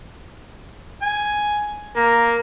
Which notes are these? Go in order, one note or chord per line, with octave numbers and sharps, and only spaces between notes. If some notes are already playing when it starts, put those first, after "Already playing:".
G#5
A#3